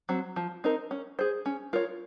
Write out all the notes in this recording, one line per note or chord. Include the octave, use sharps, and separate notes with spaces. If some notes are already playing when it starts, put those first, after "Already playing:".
F#3 C4
F3
C4 D#4 A#4
C#4
G#4 C5
C#4
F4 A#4 C#5